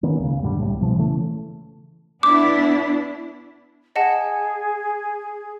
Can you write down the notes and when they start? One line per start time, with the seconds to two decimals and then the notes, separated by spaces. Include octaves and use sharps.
0.03 D#3 A#3 B3 C#4
0.19 C#2 C#3
0.43 F#2 A#2 D3 G3
0.60 C2 A2 F3 G3
0.80 B2 E3 F3
0.98 C#3 E3 A3
2.23 B3 D4 E4 D6
3.96 G#4 D#5 F#5 A5